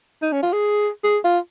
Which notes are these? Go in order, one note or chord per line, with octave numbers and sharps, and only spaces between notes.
D#4
C#4
F4
G#4
G#4
F4